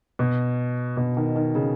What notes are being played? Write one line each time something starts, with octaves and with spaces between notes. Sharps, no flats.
B2
B2
D#3
D#3
C#3